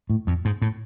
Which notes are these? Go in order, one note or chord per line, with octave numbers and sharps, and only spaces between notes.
A2
F2
G#2
A2